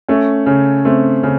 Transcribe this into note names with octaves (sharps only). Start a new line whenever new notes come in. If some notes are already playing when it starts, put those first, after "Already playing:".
A3 C#4
C#3
A3 C4
C#3